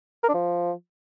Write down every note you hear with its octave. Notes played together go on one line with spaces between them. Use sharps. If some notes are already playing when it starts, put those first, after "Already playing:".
A#4
D4
F3